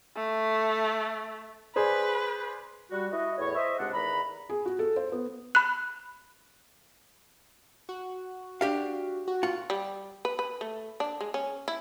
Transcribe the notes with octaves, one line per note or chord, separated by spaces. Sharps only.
A3
G#4 B4 C5 D5
G3 F#4
E4 F#4 D#5
E2 A2 E4 C#5
C5 D#5 E5
C#2 C3 G#3 D4 F#5
E2 D#3 A#5 B5
G#4
F#4
A4
C5
B3
B5 F#6
F#4
D4 G4 F5
F#4
F4 F#5
G3
B4
B4
A3
D4
G#3
C#4
E4